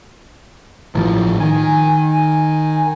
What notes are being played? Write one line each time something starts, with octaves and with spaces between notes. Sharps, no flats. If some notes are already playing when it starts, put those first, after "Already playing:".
A1 A2 F3
D#3 G#5